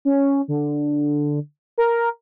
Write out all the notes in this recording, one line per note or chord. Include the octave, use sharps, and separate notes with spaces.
C#4
D3
A#4